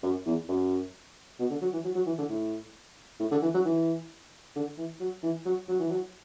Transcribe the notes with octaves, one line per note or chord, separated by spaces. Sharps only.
F#2
E2
F#2
B2
D3
F#3
E3
F#3
F#3
E3
D3
A2
A2
D3
E3
F#3
E3
D3
E3
F#3
E3
F#3
F#3
E3
F#3